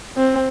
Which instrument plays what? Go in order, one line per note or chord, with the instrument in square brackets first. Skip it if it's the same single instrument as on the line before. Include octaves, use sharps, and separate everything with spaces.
[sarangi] C4